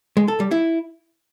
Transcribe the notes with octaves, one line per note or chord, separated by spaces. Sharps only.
G#3
A4
G3
E4